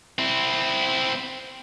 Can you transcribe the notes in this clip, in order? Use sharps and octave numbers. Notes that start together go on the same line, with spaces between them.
C4 E4